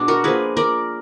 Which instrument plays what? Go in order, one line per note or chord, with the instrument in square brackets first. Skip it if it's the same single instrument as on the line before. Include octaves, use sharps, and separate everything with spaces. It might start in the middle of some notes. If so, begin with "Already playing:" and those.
Already playing: [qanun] B2 G#3 D4
F#4 A#4
F3 A#3 G#4 B4
A#4 D5